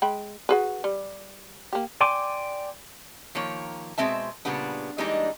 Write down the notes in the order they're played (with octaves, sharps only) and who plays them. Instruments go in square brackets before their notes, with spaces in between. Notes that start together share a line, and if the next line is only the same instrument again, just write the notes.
[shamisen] G#3 G5 B5
F#4 G#4 B4
G3
A#3 G4
[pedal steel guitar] D5 G5 G#5 C6 D6
[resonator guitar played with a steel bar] D#3 F3 A#3 C#5
B2 G#3 C4 E5 A5
A#2 C#3 G3 B3 D4
E3 G3 G#3 A#3 D4 D#4